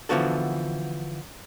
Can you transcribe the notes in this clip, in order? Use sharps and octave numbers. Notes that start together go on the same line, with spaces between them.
D3 E3 F3 B3 F#4 A4